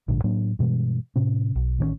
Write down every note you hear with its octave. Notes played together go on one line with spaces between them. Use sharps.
A#1 G#2 D3
A2 F#3 A#3 D4
G2 B2 E3 G#3
A2 C3 C#4
B1
A1 D#3 A#3 C#4